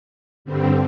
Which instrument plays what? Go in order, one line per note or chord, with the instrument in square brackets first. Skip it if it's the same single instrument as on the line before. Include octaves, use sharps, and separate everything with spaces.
[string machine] G2 D3 G3 C4